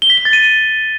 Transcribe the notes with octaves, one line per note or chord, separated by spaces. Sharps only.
G7
B6
G7
A6
D#7